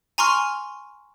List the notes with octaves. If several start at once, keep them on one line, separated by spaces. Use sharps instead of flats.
G#5 A#5 C6 C#6 F6